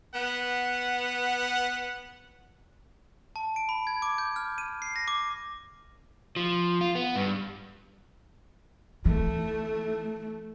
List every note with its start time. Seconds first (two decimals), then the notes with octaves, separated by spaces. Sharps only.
0.15 B3 F#5
3.36 A5
3.56 D7
3.69 B5
3.87 G#6
4.02 D6
4.18 G6
4.36 F6
4.58 D#7
4.82 C7
4.96 A#6
5.08 D6
6.36 F3
6.81 F4
6.95 B3
7.16 G2
9.05 E3 A3